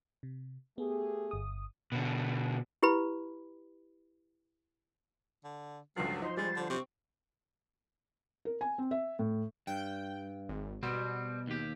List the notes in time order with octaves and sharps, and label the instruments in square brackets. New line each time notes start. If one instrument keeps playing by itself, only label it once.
[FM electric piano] C3
[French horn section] A3 G4 G#4 [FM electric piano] B3
[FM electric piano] G1 D#6
[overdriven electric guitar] B2 D3
[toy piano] E4 G4 B4 B5
[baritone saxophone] D3
[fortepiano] C#2 G2 F3 [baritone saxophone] F#3 [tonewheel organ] A4 [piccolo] C7
[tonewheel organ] F3 C5 [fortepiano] D#4 [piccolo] C6
[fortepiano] G3 [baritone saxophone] G#3 [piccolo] A6
[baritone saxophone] D3
[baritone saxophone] C3 [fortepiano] C4 [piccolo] C#6
[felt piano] A#4
G#5
C4
E5
A2
[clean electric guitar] G2 [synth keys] G5
[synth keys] G#1
[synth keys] B2 [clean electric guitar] G3 C4
[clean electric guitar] D#2 G4